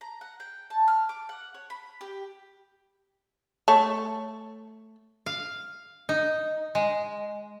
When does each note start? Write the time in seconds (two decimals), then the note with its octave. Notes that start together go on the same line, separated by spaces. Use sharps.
0.01 A#5
0.21 F#5
0.40 G5
0.70 A5
0.88 F6
1.09 D6
1.29 F#5
1.54 C#5
1.70 B5
2.01 G4
3.68 A3 C#5 A5
5.26 F5
6.09 D#4
6.75 G#3